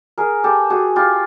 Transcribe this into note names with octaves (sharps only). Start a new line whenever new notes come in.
G#4 A#4
G4 A4
F#4 G#4
F4 G4